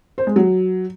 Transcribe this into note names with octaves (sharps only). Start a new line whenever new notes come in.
C5
G#3
F#3